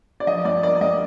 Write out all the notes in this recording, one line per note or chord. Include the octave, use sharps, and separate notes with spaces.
D5
F3 D#5
G2 D5
A#3 D5
G2 D#5